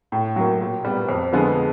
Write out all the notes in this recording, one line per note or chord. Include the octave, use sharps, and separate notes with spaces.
A2
F#3 A#3
A#2
G3 B3
F2
D3 F3 G#3 B3